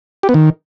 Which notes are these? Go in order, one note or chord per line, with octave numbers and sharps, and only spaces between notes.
G4
B3
D#3